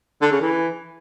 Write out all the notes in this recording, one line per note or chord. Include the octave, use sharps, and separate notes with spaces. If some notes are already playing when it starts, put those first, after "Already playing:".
D3
C#3
E3